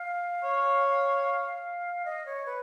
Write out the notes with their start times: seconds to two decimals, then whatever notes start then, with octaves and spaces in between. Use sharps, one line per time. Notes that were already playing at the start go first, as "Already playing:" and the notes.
Already playing: F5
0.44 C#5
2.05 D#5
2.26 C#5
2.46 B4